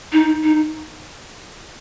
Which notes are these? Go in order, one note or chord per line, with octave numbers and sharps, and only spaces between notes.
D#4
D#4